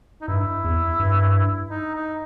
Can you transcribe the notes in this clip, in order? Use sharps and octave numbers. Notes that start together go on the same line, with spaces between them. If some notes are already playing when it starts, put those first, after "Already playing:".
D#4
G2 E4
E2
G2
D#4
D#4